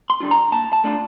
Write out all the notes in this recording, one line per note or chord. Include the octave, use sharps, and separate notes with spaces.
C6
D3 G3 D4 F4
A#5
A#2 A5
A5
A3 D4 F4